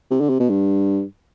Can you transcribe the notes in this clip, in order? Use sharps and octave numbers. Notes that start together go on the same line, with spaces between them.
C3
D3
C3
B2
G2